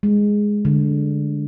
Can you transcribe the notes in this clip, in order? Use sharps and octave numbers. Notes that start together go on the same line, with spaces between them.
G#3
D3